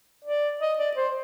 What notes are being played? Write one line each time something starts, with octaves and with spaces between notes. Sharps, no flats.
D5
D#5
D5
C5